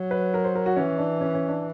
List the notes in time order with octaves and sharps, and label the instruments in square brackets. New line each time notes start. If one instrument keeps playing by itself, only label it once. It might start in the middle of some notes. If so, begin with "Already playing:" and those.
Already playing: [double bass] F#3
[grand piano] B4
A#4
C5
A#4
F#4
[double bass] E3 [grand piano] C#4
[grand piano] D4
C#4
C#4
D4